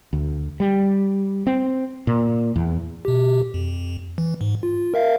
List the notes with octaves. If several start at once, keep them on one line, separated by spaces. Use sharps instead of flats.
D2
G3
C4
A#2
E2
B2 G4
F2
E3
G#2
F4
A#4 E5 F5